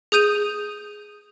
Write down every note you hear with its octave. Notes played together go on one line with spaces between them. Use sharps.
G#4 D#6 G6 D#7 F7